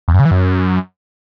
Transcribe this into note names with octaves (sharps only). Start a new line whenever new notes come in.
E2
F#2
C#3
E3
F#2